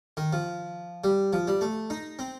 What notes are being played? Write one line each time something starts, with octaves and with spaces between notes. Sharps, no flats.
D#3
F3
G3
F3
G3
A3
D#4
C4